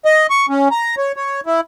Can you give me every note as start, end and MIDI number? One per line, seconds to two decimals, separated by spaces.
0.05 0.27 75
0.30 0.46 85
0.49 0.68 61
0.71 0.95 82
0.98 1.12 73
1.16 1.41 73
1.46 1.61 64